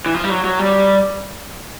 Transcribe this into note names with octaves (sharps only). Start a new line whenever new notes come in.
E3
F3
G3
F#3
F#3
G3